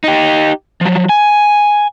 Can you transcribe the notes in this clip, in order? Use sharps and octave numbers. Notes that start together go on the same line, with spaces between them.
D#4 G4
F3 F#3
G#5